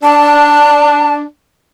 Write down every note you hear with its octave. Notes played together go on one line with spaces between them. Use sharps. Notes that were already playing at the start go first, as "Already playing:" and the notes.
D4 A5